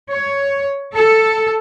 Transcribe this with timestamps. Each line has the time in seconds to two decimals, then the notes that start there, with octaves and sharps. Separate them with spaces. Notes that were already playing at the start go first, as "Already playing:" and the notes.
0.10 C#5
0.95 A4